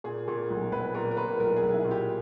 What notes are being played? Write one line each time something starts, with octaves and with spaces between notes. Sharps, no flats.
A#2 G#4
A#2
B1
B1 B4
A#2 A#4
A#4
A#2 B4
B1 A#4
G#4
B1
E4
A#2
G4